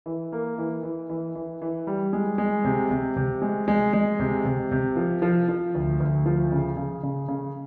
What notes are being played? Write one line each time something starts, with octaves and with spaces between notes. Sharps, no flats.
E3
A#3
E3
E3
E3
E3
E3
G3
G#3
G#3
C3
C3
C3
G#3
G#3
G#3
C3
C3
C3
F3
F3
F3
D2
D2
F3
C#3
C#3
C#3
C#3